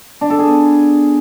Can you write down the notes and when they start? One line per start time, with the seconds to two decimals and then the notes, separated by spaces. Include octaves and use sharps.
0.21 D4
0.30 A4
0.39 G#4
0.48 B3